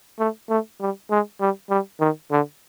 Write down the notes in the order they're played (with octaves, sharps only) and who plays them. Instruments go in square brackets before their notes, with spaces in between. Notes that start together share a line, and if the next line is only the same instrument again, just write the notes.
[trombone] A3
A3
G3
G#3
G3
G3
D#3
D3